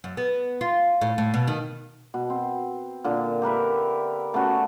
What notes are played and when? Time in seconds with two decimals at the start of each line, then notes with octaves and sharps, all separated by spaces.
0.04 F#2
0.17 B3
0.61 F4
1.01 A2
1.18 A2
1.34 B2
1.48 D#3
2.14 B2
2.30 C4
3.04 A#2 D3
3.42 G4 A#4 B4 E5
4.34 A3 B3 C#4 F#4